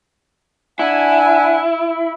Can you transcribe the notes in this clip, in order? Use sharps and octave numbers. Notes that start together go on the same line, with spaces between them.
D4 E4 F#5 G#5